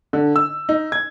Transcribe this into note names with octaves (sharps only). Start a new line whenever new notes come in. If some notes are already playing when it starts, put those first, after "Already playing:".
D3
E6
D#4
G#6